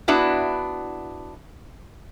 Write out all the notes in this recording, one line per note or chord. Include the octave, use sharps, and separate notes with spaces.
B3 D4 E4 F#4